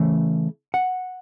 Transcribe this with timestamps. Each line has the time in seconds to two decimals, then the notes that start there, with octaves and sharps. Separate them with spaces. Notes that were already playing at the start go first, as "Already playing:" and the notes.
Already playing: C#3 E3 A3
0.74 F#5